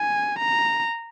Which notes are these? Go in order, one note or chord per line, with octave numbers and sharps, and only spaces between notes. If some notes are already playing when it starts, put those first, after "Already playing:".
Already playing: G#5
A#5